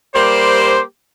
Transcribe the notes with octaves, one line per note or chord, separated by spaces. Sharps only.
G3 A#3 G4 C5